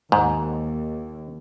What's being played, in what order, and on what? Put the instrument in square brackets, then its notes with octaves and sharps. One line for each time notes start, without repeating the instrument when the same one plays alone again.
[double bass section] D#2 [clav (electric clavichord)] G#2